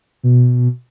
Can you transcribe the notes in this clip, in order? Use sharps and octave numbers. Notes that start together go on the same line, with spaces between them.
B2